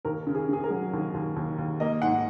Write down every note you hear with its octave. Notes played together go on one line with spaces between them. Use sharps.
D#2 A#4
C#3
G#4
C#3 G#4
A#4
F#3
D#2
D#2
D#2
D#2
A#3 D#5
G#2 F#5